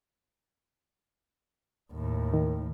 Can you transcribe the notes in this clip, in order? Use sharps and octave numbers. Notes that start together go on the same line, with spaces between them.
D#2 A2
D#3